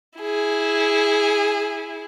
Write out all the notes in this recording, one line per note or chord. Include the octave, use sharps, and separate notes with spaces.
E4 G#4